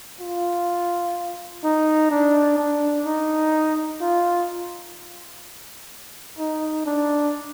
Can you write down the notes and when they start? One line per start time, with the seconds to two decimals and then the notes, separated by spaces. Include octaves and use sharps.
0.21 F4
1.64 D#4
2.11 D4
2.58 D4
3.06 D#4
4.01 F4
6.39 D#4
6.86 D4